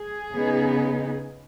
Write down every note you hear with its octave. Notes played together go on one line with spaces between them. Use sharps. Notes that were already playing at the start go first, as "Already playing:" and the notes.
Already playing: G#4
C#3 B3 D#4